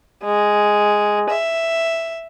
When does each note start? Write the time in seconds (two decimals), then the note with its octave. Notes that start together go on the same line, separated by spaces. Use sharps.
0.24 G#3
1.30 E5